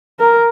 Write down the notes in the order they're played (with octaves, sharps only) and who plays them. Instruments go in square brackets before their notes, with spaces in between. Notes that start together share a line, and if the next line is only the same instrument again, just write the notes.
[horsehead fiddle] A#4